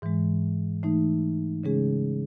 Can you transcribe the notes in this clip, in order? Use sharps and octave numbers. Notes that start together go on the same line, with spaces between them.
G#2 E3 G#3
E3 A3 D#4
C#3 G#3 C#4 G#4